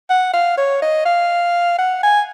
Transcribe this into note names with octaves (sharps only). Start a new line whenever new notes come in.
F#5
F5
C#5
D#5
F5
F#5
G#5